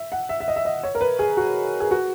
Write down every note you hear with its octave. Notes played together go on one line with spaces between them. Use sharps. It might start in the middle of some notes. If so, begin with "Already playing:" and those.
Already playing: E5
F#5
E5
E5
D#5
E5
D#5
C#5
A#4
B4
G#4
F#4
G#4
F#4